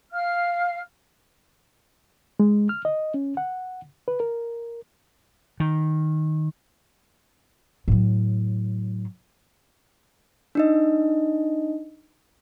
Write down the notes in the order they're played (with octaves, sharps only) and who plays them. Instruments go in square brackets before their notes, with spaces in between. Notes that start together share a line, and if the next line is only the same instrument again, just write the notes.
[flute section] F5 F6
[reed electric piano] G#3
F6
D#5
C#4
F#5
B4
A#4
[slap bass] D#3
[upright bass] A2 F#3
[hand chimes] D4 D#4 D#5